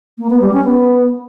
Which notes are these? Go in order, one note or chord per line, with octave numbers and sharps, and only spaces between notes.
A#3
B3
G3
C#4
B3